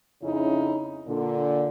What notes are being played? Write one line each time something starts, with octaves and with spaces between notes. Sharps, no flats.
F2 C#3 C#4 D#4 E4
A#2 D3